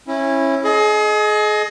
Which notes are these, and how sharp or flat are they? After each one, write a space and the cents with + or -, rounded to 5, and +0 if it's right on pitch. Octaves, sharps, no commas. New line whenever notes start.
C#4 -25 E4 +0
G#4 +35 D#5 +0